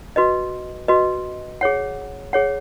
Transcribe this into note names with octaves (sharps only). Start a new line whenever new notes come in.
F#4 B4 D#5
F#4 B4 D#5
G#4 C#5 F#5
G#4 C#5 F#5